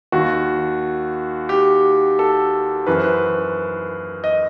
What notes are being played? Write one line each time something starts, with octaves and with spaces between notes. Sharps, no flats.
D#2 D#3 F#4
G4
A4
F#2 E3 B4
C5
B4
D#5